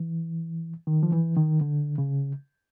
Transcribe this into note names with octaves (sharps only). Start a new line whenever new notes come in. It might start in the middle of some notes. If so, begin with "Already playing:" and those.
Already playing: E3
D#3
F3
E3
D#3
D3
C#3